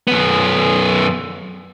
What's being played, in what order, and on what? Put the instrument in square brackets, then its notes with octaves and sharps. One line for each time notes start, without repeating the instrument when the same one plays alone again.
[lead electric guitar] F#2 B3